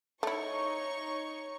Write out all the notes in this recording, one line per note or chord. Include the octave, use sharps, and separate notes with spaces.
A3 D#4 E4 C#5 C#6